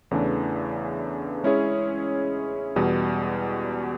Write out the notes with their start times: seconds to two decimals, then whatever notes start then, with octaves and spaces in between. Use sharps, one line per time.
0.11 E2 C#3 E3 A3 D4
1.44 G#3 C#4 E4 G#4 C#5
2.76 E2 B2 G3